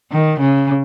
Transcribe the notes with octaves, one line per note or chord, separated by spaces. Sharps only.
D#3
C#3